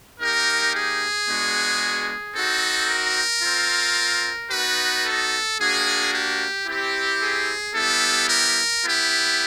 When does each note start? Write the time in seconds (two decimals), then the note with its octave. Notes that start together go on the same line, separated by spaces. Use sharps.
0.20 A#3 D#4 G4 A#4
0.74 G#4
1.28 G#3 B3 D4 F#4
2.35 C4 D#4 F#4 A4
2.90 A#4
3.43 C4 F4
4.51 B3 D#4 F#4 B4
5.06 A4
5.59 A#3 D4 F#4 G#4
6.13 G4
6.67 C4 E4 G4
7.22 G#4
7.75 G3 B3 E4 G4 A4
8.28 A#4
8.83 B3 E4 G4